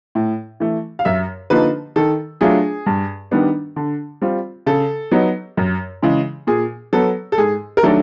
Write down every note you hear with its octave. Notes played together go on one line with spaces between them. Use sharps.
A2
E3 A3
F5
F#2 E5
D3 F3 A#3 D#4 B4
D#3 A4
F#3 A3 D4 F4 G#4
G2
D#3 G3 B3 D4
D3
G3 C4 F4
C#3 A4
F#3 B3 D#4
F#2
C#3 E3 G#3
A#2 G#4
F#3 B3 A4
A4
G#2 G#4
A#4
D#3 F#3 A3 D4 A4